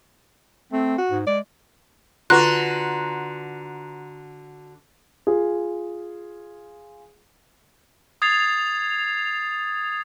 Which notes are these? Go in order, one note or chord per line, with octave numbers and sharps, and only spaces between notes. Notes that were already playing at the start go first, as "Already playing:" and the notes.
A3 C4
F#4
G#2
G#3 D5
D3 F4 F#4 B4 A#5 C6 F#6
F4 G#4
D#6 G#6 A6 C7 F7